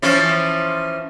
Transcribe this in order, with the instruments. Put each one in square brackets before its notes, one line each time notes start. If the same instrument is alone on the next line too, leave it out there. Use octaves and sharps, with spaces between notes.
[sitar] E3 F3 C#4